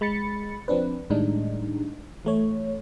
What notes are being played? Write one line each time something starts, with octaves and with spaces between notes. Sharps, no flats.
G#3 B5 A6 C#7
F3 C4 D4 B4
A2 D#3 G3 G#3 D4 D#4
E3 A3 C#5